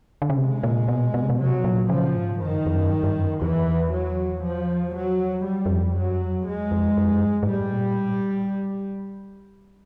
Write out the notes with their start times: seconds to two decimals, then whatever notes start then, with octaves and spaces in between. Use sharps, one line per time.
0.22 D3
0.30 C#3
0.37 C3 G#3
0.63 A#2
0.88 B2
1.14 B2
1.22 C3
1.30 B2
1.39 C3 F#3
1.60 B2
1.64 A#2
1.89 C#3 F3
2.15 G#2
2.41 F#2 D#3
2.58 G2
2.66 F2
2.74 F#2
2.91 G2
3.03 G2
3.16 F#2
3.42 E2 E3
3.93 F#3
4.43 F3
4.95 F#3
5.45 G3
5.66 F#2
5.70 F2
5.96 F#2 F#3
6.21 F2
6.46 E2 G#3
6.71 F2
6.97 F#2
7.05 F2
7.11 F#2
7.23 G2
7.43 G#2
7.47 A2 G3
7.73 A#2
7.98 A2